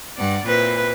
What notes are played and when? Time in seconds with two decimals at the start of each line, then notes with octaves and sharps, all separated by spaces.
0.17 G2 D5 F#5
0.46 A#2 C4 E4 B4